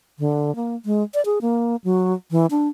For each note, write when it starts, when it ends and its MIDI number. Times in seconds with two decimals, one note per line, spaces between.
0.19 0.54 50
0.56 0.75 58
0.85 1.03 56
1.14 1.24 74
1.25 1.39 68
1.42 1.76 58
1.84 2.13 54
2.31 2.46 52
2.51 2.67 62